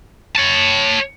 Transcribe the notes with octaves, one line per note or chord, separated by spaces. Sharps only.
C#5 A5